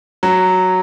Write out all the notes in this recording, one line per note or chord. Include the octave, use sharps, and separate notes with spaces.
F#3